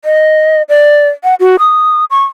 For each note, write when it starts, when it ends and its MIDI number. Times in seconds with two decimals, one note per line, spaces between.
0.05 0.62 75
0.69 1.09 74
1.24 1.35 78
1.40 1.56 66
1.59 2.05 87
2.11 2.24 85